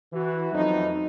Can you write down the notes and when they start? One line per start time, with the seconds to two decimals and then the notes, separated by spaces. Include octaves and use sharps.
0.13 E3 F#4
0.53 F2 F#3 A3 B3 D#4